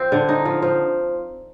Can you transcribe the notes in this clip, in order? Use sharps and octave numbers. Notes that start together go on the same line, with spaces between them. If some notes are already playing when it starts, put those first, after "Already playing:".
Already playing: F3 C4
D3
D#4
F3
F3